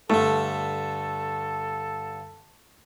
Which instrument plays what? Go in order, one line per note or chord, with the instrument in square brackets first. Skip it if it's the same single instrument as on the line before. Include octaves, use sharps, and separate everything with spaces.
[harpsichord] G2 D3 [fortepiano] A3 [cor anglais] A4